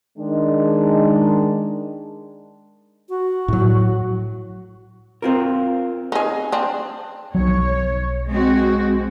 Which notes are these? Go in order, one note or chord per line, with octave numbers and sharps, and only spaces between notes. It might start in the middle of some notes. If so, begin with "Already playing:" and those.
D#3 G#3 D4
F#4
A2 F#3
C4 F4 A#4
D#4 G#4
C4 D4
B1 F#3 C#5
G#3 C4 F#4